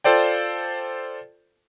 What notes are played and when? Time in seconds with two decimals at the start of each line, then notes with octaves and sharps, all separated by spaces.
0.04 F4 A4 C5 D5 G5